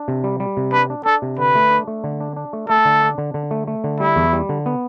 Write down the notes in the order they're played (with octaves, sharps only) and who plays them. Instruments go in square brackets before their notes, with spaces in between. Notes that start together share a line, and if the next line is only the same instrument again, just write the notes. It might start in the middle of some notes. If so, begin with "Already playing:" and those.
Already playing: [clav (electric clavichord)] D4
C3
G3
G3
C3
[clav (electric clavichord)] D4 [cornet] B4
[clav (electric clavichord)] D4
[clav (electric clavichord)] D4 [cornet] A4
[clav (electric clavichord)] C3
[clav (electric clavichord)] D3 [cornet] B4
[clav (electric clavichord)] A3
D4
A3
D3
D4
D4
A3
[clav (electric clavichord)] A3 [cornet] A4
[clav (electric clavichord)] D3
D4
D3
D3
A3
A3
D3
[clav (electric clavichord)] G3 [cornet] E4
[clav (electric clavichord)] E2
G3
D3
B3